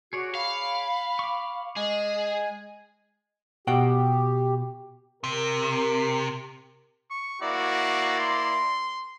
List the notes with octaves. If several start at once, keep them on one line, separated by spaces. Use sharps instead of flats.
F#4 G#4 C#5 D5
F5 B5
C#6 D6
G#3 G#4
G#5
B2 G4 F#5 G5
C3 A#4
C#6
A#3 E4 F#4 D5
C6